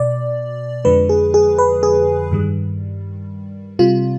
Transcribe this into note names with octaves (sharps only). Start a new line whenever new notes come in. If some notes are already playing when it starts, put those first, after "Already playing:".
Already playing: B2 D5
F2 D3 F3 G#3 B4
G#4
G#4
B4
G#4
G2 D#3 G3
C3 G3 F4